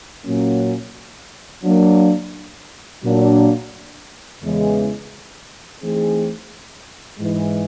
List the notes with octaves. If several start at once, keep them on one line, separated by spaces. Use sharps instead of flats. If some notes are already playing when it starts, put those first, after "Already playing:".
A#2 F#3 A#3 C#4
F#3 A#3 D4
A#2 F#3 A#3 D4
E2 C#3 E3 G#3
E3 A3 C4 D#4 G#4
G#2 E3 G#3